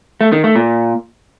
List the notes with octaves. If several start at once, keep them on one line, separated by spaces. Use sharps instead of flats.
A3
D#3
A3
A#2